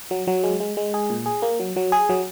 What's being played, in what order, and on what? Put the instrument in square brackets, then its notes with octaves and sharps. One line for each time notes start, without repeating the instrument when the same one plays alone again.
[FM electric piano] F#3
F#3
G#3
G#3
G#3
G#4
A#2
G#4
A#3
F#3
F#3
G#4
F#3